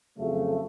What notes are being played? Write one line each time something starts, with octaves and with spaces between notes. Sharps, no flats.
F2 C#3 F#3 A3